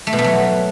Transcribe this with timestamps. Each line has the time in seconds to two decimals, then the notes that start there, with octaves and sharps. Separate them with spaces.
0.07 A3
0.13 B2
0.19 A3
0.24 F#3